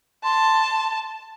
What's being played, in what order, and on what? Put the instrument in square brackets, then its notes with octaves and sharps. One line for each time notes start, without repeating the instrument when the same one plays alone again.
[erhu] A5 [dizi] C6